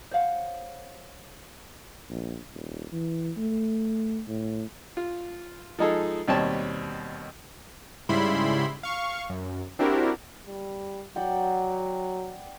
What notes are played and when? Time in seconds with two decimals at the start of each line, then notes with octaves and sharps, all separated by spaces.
0.11 C5 C#5 F5 F#5
2.10 A#1
2.53 D#1
2.92 E3
3.37 A3
4.28 A2
4.97 F4
5.79 F3 G#3 D#4 G#4 A4
6.28 D#2 B2 G3 C4 C#5 A5
8.09 G#2 C#3 G3 E4 B5 C6
8.83 F5 C#6
9.30 F#2
9.79 C4 D4 E4 F#4 G4 A#4
10.47 G3
11.16 F#3 D5 F#5 G5